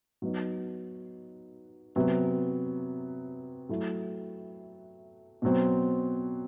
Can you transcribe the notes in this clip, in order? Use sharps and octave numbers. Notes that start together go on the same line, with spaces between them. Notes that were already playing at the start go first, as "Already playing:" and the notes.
F#3 B3 D#4
C3 F#3 B3
F#3 A3 E4
B2 F#3 C4